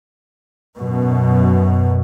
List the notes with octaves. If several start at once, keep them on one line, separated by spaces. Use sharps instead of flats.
F#2 B2